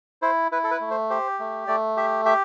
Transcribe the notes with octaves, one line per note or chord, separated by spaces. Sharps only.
E4 C5
E4 B4
A4
B4
A3
C5
G4 C5
A3
A3 D5
G4 E5
G4 E5